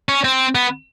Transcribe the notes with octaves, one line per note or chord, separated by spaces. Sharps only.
C#4
C4
B3